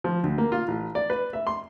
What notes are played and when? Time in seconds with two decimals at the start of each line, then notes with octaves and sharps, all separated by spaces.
0.04 F3
0.24 D2
0.38 A#3
0.52 F4
0.68 A1
0.95 D5
1.10 B4
1.33 E5
1.47 C6